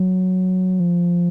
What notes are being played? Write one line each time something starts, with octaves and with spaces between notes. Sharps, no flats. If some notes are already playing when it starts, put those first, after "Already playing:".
Already playing: F#3
F3